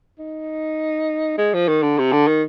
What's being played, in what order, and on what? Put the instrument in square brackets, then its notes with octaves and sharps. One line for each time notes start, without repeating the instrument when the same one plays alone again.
[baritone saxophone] D#4
G#3
F3
D#3
D3
C3
D3
D#3